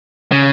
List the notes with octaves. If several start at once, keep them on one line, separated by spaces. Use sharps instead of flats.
C#3